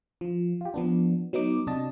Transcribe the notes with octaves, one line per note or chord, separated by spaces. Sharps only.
F3
F4 G4
F3 B3 D4
F#3 B3 D#4 D6
C3 D4 F#4 D#5 A5